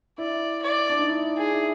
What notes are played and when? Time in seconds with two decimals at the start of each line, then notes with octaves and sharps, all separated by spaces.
0.18 E4 D5
0.62 D5
0.89 D4
0.99 D#4
1.08 E4
1.38 G#4
1.53 E4